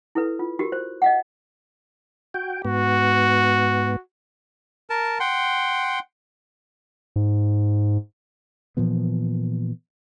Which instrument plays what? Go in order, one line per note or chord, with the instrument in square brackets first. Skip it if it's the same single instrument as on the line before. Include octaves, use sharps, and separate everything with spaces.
[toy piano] E4 A4 B4
F4
F#4 G4 A#4
C5
D#5 F5 F#5
[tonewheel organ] F#4 G5
[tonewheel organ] G#2 B3 [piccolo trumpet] F#4
[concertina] A#4 A5
F#5 G5 C6
[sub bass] G#2
[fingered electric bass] A#2 E3 F3 B3